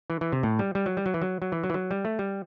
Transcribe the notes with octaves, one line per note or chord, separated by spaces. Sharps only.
E3
E3
C3
A2
G3
G3
F#3
G3
F#3
E3
F#3
F#3
E3
F#3
E3
F#3
G3
A3
G3